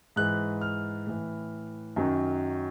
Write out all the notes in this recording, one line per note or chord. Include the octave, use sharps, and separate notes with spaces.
G#2 E3 F#6
F6
A2 E3
F#2 D#3 F#3